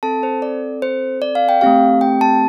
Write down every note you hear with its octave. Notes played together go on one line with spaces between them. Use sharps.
C4 A4 A5
C5
D5
C5
D5
F5
G5
A3 C4 G4 F5
G5
A5